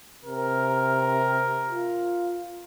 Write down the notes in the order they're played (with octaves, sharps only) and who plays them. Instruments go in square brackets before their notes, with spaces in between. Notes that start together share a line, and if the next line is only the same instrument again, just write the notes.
[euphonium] C3 [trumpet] A#4
[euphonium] F4